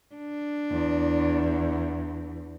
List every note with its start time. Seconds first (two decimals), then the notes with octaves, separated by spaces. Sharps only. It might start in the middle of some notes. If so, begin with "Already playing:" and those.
0.15 D4
0.72 E2